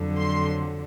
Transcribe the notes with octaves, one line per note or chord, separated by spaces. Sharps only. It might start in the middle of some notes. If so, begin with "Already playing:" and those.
Already playing: F2 D3 F#3
C6